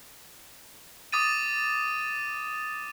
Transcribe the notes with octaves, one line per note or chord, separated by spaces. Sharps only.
D6 D#6 A6 D#7